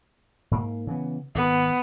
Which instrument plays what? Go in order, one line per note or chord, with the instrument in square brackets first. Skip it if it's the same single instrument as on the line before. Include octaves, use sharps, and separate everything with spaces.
[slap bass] G#2 A#3
C#3 E3 B3
[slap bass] G#1 [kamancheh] B3